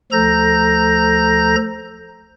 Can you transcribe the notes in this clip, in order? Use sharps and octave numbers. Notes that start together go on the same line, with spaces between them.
D2 F3 A4 A#5 G6 A#6